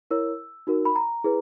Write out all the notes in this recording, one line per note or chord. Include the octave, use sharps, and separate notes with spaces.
E4 A#4 C#5 E6
D#4 F#4 A#4
B5
A#5
E4 G#4 B4